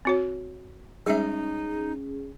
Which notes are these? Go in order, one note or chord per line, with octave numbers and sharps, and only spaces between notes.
C4 F#4 C#5
G3 G#3 C#4 D#4 G#4 E5